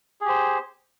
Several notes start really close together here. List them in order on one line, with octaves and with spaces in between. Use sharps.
G#4 G4 C5